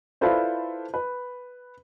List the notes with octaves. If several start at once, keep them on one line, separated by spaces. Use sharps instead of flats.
E4 F4 A4 B4 C5 D5
B4